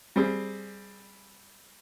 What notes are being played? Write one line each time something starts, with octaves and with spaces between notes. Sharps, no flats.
G3 C4 G#4